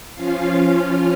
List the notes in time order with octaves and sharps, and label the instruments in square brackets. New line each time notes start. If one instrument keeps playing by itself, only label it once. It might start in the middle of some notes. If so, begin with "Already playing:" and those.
[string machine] F3 C#4 F4 F5